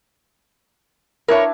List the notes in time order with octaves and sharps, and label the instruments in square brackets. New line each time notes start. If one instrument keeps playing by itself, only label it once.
[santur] D4 E4 B4 [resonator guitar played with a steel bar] A#4 C#5